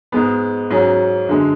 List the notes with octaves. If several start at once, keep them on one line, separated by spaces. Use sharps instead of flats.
G#2 G#3 B3
G#2 F#3 C#4 G#4
F#2 D3 G#3